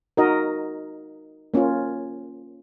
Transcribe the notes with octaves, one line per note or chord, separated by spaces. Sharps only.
D#4 F#4 A#4 D#5
A#3 C#4 F4